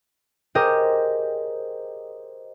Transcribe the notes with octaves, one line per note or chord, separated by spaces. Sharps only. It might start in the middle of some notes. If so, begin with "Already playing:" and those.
G4 G#4 A#4 C5 C#5 D#5